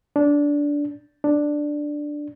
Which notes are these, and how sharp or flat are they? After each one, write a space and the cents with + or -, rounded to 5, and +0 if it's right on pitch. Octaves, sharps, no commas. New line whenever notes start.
D4 -15
D4 +5